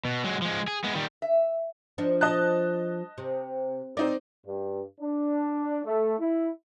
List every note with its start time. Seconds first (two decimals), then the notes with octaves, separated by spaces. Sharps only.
0.05 B2
0.24 F#3 G#3
0.42 F3 G#3
0.68 G#4
0.84 G#3 B3
0.95 D#3 G3
1.22 E5
1.98 F3 D4 D#4
2.21 D#5 A5 F#6
3.18 C3
3.97 C4 D#4 A#4 D5
4.46 G2
5.00 D4
5.85 A3
6.19 E4